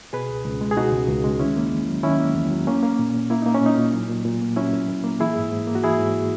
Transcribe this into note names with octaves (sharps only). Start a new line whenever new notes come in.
B2 G#4 B4
C#2
C#2
G#3
G#4
B2 D#4 F#4
C#2
C#2
G#3
D#3 C#4 E4
A#3
E2
F#3
D#3 C#4 E4
A#3
E2
F#3
A#3 C#4
A#3
A#2
A#2
A#3 E4
A#3 D#4
C#4
A#2 D#4
A#2
F#3
A#2
A#2
A#3
F#3 C#4 E4
A#2
A#2
A#3
E3 E4 G#4
G#2
G#2
A#3
F#4
E3 E4 G#4
G#2